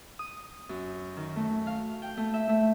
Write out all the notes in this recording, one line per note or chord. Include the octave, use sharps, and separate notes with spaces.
D#6
F#2
D#3
A3
F5
G5
A3
E5
A3